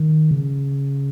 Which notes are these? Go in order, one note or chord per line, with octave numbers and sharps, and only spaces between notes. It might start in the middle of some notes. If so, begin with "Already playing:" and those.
Already playing: D#3
C#3